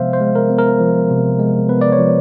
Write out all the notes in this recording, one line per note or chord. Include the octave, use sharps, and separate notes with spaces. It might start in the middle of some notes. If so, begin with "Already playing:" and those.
Already playing: C3 F3 G#3 B3 C5 E5 F5
C5
G#3
A#4
B3
A#4
F3
C3
G#3
B3 B4
D5
C#5
F3